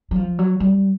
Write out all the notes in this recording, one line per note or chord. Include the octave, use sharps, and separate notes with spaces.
F#3
F3
F#3
G3